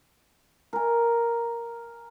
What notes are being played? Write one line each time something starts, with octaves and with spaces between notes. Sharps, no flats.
A#4 G#5